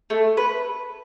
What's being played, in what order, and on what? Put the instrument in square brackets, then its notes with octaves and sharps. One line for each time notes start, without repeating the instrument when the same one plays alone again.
[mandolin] A3
B4